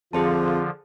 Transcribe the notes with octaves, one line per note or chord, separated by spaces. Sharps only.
F2 D3 F3 F4 G#4 C5 A5